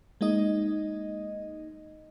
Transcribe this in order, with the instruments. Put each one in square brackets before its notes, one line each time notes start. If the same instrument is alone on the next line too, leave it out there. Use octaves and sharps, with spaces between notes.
[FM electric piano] G#3 A#3 D#4 D#5